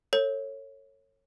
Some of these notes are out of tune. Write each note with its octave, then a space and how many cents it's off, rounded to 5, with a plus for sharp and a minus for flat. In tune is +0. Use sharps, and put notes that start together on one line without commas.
A4 +35 C#5 -15